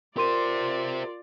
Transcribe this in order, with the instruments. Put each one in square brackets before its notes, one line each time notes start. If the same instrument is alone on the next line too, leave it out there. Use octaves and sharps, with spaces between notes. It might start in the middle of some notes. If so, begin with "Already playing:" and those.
[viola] F4 D5 [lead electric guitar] G4 C5 [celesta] A#4 C6 D#7